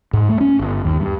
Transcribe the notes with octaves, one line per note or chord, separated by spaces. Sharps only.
G#2
A3
C#4
G1
D#2
G2